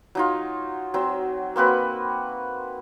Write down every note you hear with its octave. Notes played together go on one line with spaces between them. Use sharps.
F#3 D#4 F4
F#3 C4
A#3 C4 F#4 B4